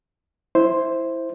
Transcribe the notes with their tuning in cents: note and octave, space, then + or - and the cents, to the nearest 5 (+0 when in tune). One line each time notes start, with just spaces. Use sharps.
E4 +0 C5 +0